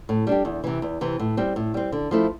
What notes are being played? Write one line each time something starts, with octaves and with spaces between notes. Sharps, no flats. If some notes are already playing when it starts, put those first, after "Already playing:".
A2
G3 D4 G4
E2
C3 E3
E2
C3 E3
A2
G3 C4
A2
G3 C4
D3
F3 A3 E4